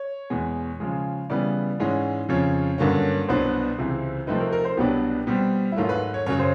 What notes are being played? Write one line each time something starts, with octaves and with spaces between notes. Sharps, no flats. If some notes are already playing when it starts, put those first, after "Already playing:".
Already playing: C#5
E2 B2 G#3
C#3 F3 G#3
C#3 E3 G3 B3 D5
G#2 E3 G#3 C#4
F2 C#3 F3 C#5
G2 D3 F#3 A#3 C#4
C2 B2 F#3 B3 D4 C5
C#2 C3 E3
C3 F3 A3 C4 D#4 B4
A#4
A#4
C5
C2 B2 F#3 B3 D4 G4
B2 G3 C4
E4
G#2 D#3 F#3 A3 F4
B4
C#5
F#2 C#3 F#3 C#5
C5